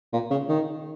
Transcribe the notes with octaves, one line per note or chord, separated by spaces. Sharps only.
A#2
C#3
D#3